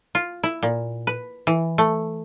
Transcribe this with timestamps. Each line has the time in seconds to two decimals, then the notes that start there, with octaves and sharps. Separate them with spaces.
0.15 F4
0.43 E4
0.63 A#2
1.07 B4
1.47 E3
1.78 A3